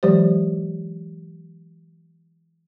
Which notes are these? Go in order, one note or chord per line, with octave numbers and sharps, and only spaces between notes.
E3 F#3 G#3 G4 C5